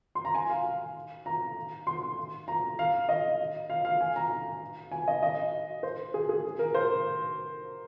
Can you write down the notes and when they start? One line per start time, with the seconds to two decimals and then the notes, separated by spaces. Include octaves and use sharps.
0.15 C6
0.25 A#5
0.35 G#5
0.49 F5
1.26 A#5
1.87 C6
2.48 A#5
2.79 F5
3.09 D#5
3.70 F5
3.85 F5
4.01 G#5
4.16 A#5
4.91 G#5
5.08 D#5
5.23 D#5
5.83 C5
6.14 G#4
6.29 G#4
6.59 A#4
6.75 C5